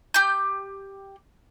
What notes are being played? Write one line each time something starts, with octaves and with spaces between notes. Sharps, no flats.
G4 G6